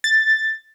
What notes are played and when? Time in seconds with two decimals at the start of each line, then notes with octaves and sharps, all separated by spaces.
0.04 A6